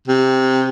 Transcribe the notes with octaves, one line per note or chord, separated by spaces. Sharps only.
C3